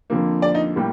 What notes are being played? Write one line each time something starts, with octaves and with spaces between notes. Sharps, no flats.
F2 D3 F3 A#3
D5
D#4
A2 G3 A#3